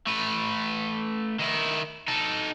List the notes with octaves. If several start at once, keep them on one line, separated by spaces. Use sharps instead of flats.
A3 B4
D#3 E4
D#4 A4